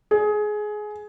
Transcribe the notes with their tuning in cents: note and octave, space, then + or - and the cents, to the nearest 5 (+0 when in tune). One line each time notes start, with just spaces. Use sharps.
G#4 +20